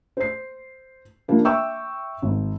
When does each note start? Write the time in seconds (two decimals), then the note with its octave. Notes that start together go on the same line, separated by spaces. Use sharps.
0.17 C5 C7
1.28 F3 G3 A#3 D4
1.45 E5 G5 C#6 D6 E6
2.22 G#1